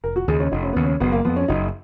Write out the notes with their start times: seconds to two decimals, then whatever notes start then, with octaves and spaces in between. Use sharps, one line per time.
0.04 F1 A#4
0.16 F#4
0.28 D#2 C#3 G#4
0.40 C#4
0.51 F1 D#4
0.63 C#4
0.73 D#2 C#3 B3
0.84 C#4
1.00 F#1 B3
1.12 A#3
1.25 F2 F3 B3
1.36 C#4
1.48 F#1 D#4